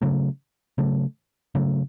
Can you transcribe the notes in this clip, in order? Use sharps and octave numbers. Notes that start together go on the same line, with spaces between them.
C#3 F#3 A3
C#3 F#3 A3
C#3 F#3 A3